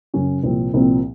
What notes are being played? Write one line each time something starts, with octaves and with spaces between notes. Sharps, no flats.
F#2 C#3 F#3 C#4 F#4
C2 A#2 F3 C4
C2 A#2 F3 C4